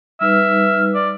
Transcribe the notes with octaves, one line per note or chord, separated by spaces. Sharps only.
G3 D#4 B4 E5 F6
D5